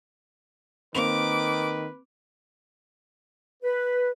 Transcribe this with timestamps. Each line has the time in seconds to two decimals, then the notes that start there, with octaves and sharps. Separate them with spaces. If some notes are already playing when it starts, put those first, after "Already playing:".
0.95 D#3 A#3 C4 B4 D6 F7
3.63 B4